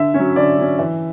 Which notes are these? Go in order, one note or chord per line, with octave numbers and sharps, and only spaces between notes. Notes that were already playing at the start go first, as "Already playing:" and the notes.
Already playing: D3 E5
F#3 C#4
D3 D5
F#3 C#4
E3 E5